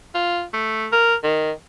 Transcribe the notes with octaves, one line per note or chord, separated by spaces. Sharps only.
F4
A3
A#4
D#3